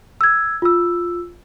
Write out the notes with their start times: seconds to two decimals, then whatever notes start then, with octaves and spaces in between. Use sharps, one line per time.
0.21 E6 G#6
0.62 F4 E6